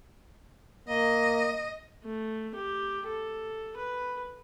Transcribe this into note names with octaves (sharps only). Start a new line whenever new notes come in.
A#3 D#5
A3
G4
A4
B4